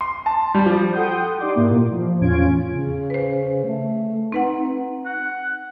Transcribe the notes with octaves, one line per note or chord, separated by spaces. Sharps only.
C6
A5
G3
F3
A4 F#5 G5 C6 D#6 G6
D#4 G4 D5 C6 D6
G#2 A#3 E4
A#2
F3
E2 A2 C#4 F4 G#6 D7
C#3
B4 C5
A3
C4 D#4 B4 F#5
F#5